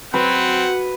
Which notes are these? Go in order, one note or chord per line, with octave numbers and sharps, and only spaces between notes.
F#3 C4 B4 F#5